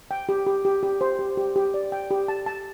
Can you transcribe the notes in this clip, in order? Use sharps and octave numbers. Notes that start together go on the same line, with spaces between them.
G5
G4
G4
G4
G4
C5
G4
G4
G4
D5
G5
G4
A5
A5